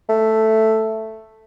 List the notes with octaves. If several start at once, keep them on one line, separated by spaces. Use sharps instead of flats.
A3